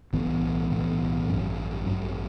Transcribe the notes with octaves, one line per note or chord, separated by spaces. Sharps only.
B1 A2 E3 B3
B1 A2 E3 B3
A1 G2 F#3 C#4
A1 G2 F#3 C#4